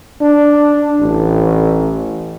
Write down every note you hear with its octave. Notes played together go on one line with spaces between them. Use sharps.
D4
A1